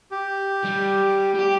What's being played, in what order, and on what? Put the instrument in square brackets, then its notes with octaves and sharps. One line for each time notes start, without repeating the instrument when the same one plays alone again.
[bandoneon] G4
[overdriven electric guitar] G3
G4 G5